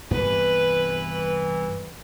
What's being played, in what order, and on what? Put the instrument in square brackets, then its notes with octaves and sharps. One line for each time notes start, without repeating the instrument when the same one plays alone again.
[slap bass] C2 G2 B3 [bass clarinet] E3 [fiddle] B4